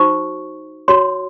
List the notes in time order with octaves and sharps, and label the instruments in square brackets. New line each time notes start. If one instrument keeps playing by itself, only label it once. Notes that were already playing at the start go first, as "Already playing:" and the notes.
Already playing: [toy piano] D#4 F#4 C5 C#6
F#4 C#5 C6